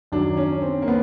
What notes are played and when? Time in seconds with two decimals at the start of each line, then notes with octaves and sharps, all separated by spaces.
0.12 F#2 D#3 F#3 D4
0.37 C#4
0.62 C4
0.82 A#3
0.88 B3